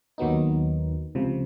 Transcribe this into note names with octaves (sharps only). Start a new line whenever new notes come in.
D#2 D#3 F#3 B3 D#4
C#2 C3 F3